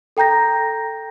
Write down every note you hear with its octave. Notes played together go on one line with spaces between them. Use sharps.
A4 G5 A#5 G6 A#6